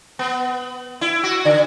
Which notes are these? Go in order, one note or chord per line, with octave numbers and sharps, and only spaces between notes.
B3
E4
F#4
D3